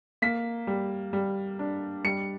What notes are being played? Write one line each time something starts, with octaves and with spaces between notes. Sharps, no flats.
A#3 B6
G3
G3
D4
G3 C#7